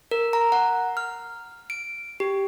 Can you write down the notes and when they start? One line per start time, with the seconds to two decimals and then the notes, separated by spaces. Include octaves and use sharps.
0.11 A#4
0.33 A#5
0.52 F#5
0.97 F6
1.70 D7
2.20 G4